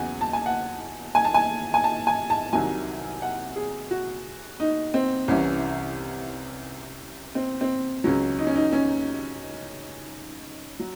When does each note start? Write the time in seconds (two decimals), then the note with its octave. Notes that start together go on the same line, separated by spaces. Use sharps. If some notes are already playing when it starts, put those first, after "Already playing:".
Already playing: E2 C#3 F#3 F#5 G#5
0.21 A5
0.33 G#5
0.46 F#5
1.15 G#5
1.25 A5
1.34 G#5
1.74 G#5
1.84 A5
2.07 G#5
2.30 A5
2.53 C2 C3 D#3 F#3 G#5
3.22 F#5
3.56 G#4
3.91 F#4
4.60 D#4
4.94 C4
5.28 C2 C3 E3 C#4
7.35 C4
7.61 C4
8.04 C#2 C#3 F#3 C#4
8.38 D#4
8.47 C#4
8.55 D#4
8.73 C#4
10.80 F#3